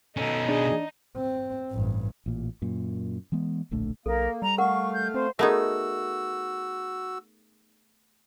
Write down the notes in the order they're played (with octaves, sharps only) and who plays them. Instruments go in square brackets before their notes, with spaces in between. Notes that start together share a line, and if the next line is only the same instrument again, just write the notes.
[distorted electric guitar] B2 C#4 [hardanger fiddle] D#4 [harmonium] A4
[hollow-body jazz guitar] D4 [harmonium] G#4 D#5
[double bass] C4
A1 G2
[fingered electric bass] A1 A#2
F#2 A#2
E3 G#3 B3
D1 A#1 D3 A3
[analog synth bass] B1 [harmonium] A#3 [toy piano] A4 [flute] A#4
[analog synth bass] G3 [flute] A#5
[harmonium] A3 F5 [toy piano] A#4 F#5 [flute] C#6
[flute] G6
[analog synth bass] C4 [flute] C5
[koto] A3 B3 D#4 [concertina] F#4 E6 [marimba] G#4 A#4